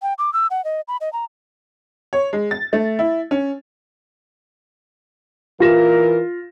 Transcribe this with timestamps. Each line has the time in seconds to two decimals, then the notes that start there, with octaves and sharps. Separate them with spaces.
0.02 G5
0.18 D6
0.33 E6
0.51 F#5
0.65 D#5
0.88 B5
1.01 D#5
1.13 A#5
2.13 C#5
2.33 G#3
2.51 A6
2.73 A3
2.99 E4
3.31 C#4
5.60 E3 F4 A#4 A#6 E7